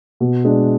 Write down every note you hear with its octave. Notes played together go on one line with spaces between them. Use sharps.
B2
G#3 D4